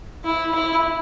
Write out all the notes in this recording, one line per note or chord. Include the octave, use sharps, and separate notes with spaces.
E4
E4